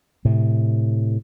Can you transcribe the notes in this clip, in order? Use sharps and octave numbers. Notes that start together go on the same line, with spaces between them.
A2 C3